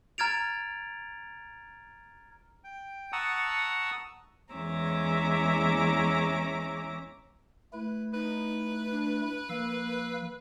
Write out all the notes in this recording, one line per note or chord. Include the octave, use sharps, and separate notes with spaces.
A#5 F6 G#6 A6 D7 F7
G5
F#5 A5 A#5 C#6 D#6 E6
E2 G#3 C#4 E5 A#5 D6
A3 E4 B4
D#4 B4
D4
F3 A#3 F5 E6